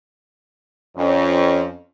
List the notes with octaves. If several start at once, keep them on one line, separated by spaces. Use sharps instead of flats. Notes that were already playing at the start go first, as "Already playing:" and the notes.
F2 C#4